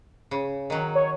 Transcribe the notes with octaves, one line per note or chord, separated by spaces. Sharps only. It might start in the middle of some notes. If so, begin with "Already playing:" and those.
C#3
D#3 F#3
C#5